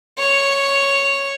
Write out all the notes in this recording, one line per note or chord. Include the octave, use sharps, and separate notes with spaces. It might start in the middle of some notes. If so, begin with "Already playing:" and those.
C#5